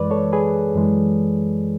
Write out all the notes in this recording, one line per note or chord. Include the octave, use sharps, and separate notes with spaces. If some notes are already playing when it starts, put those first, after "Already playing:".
Already playing: F#2 E3 G#3 B4 D5
A4 C#5
G#4 B4
F#2 E3 G#3